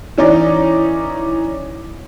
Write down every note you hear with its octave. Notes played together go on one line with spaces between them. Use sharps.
E3 C#4 D#4 D5